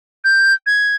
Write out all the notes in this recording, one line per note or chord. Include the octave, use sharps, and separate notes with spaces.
G6
G#6